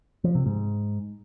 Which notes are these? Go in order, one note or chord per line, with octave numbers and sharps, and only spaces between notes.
F3
C3
G#2